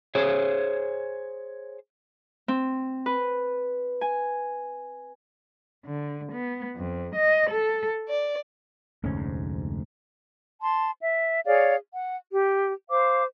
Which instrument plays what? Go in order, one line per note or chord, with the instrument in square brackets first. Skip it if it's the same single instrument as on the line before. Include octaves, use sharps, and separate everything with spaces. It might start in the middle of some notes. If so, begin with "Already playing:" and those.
[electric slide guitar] G#4 C5 C#5
[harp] C4
B4
G#5
[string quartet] D3
B3
F2
D#5
A4
D5
[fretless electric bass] F1 D2 G#2 C#4
[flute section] A5 C6
E5
G#4 C#5 D5 F5
F#5
G4
C5 F5 D6